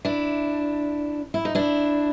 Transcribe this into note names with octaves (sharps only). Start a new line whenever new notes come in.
D4 E4
E4
D#4
D4 E4